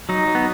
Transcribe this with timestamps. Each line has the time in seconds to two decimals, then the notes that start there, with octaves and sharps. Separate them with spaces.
0.09 F#3 D#4
0.27 F#3
0.35 B3